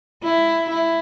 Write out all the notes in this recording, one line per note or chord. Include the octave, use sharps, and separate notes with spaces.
E4
E4